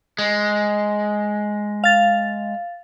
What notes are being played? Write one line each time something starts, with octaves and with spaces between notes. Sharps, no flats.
G#3
F5 A6